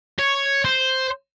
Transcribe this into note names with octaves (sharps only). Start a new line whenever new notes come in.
C#5
C5